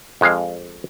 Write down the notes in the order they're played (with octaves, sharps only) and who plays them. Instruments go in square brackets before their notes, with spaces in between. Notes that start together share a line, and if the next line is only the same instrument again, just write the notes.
[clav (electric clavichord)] F2 G#3 F5